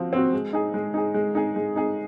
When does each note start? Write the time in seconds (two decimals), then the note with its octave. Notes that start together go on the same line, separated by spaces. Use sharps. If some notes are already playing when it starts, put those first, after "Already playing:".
Already playing: F3 C4 F#4
0.13 C4 F#4
0.33 G#3
0.53 D#4 G#4
0.74 G#3
0.94 D#4 G#4
1.14 G#3
1.35 D#4 G#4
1.56 G#3
1.76 D#4 G#4